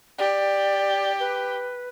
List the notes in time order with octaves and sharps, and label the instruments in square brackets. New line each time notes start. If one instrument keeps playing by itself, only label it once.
[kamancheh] G4 [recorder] D5
[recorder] B4